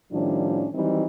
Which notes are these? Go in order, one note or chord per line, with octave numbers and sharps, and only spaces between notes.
A2 D#3 F3 G3 C#4 D4
D#3 E3 F#3 G3 C4 D#4